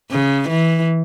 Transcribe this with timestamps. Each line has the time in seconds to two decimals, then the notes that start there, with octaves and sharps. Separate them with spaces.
0.11 C#3
0.49 E3